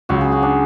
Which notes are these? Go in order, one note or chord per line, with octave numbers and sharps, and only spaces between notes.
C#2 C#3 F#3 F#4
G#4
F#4
D4